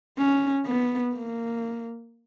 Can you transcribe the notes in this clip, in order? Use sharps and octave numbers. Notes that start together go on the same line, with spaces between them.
C#4
B3
A#3